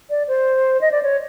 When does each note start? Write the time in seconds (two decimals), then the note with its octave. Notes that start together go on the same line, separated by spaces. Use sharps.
0.10 D5
0.28 C5
0.81 D#5
0.92 D5
1.03 C#5